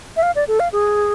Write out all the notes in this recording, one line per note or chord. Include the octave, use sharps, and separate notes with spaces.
E5
F5
D5
A4
F5
G#4